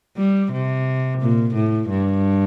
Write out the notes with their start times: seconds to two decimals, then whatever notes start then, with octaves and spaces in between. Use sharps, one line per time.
0.17 G3
0.52 C3
1.20 A#2
1.54 A2
1.89 G2